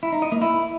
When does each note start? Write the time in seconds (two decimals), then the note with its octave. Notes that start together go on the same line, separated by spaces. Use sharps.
0.03 E4
0.12 D#4
0.22 D#5
0.32 A#3
0.42 E4